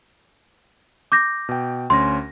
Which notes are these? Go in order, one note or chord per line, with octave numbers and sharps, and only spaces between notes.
D6 G6 A#6
B2 G5
D2 C#4 C6 A#6